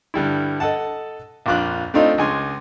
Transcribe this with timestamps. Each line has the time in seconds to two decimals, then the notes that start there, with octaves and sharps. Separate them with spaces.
0.14 G2 D3 G3 E4
0.60 A4 D#5 F#5 A5
1.46 A#1 F2 F4 D6 F#6
1.94 A3 C4 D4 D#4 F4
2.18 C#2 G#3 G#5 C6